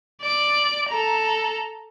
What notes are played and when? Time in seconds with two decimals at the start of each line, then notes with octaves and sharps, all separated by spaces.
0.21 D5 D7
0.88 A4 A#5